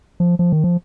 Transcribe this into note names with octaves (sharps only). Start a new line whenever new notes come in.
F3
F3
D#3
F3